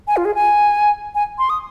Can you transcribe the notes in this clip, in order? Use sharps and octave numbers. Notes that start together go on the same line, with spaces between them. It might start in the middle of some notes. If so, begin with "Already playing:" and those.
G#5
F4
G#4
G#5
G#5
C6
D#6